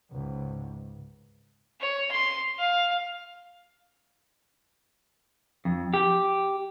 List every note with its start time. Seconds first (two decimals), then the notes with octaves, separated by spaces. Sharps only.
0.12 C#2 G#2
1.81 C#5
2.11 C6
2.58 F5
5.65 F2
5.94 G4